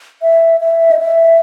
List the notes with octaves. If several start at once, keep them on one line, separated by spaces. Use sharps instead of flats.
E5
E5
D#5
E5